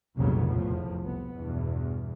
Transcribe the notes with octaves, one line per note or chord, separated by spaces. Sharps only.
F1 B1 A#2 C#3 F#3 B3
E2 A2 F3
C2 B3
E2 G2 B2